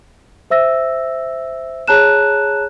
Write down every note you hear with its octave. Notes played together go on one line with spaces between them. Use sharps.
C5 E5 E6 A#6
G#4 C#5 A5 A#5 F#6 E7